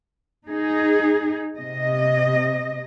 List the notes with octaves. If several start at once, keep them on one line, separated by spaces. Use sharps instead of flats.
D#4 G#4
C3 D#5